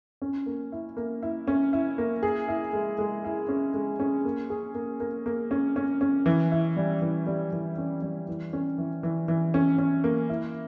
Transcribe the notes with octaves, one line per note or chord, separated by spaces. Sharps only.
C#4
A#3
E4
A#3
E4
C#4
E4
A#3
G#4
E4
G#3
G#3
E4
C#4
G#3
C#4
A#3
G#4
A#3
A#3
A#3
C#4
C#4
C#4
E3
E4
G3
E3
G3
E3
C#4
G3
E3
C#4
E3
E3
E3
C#4
C#4
A#3
E4